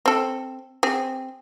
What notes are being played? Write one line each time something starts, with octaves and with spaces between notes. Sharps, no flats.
C4 A4
C4 G#4